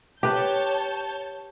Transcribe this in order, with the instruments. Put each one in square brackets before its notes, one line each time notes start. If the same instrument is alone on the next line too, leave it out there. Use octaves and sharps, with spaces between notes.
[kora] G4 B4 [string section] C#5 A5 G6